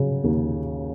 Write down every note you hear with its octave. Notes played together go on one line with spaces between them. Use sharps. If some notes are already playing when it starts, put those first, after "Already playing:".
Already playing: C#3 F#3
D#2